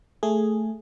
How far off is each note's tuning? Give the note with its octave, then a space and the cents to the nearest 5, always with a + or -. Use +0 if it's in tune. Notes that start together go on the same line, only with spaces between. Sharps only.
A3 +0 G#4 +0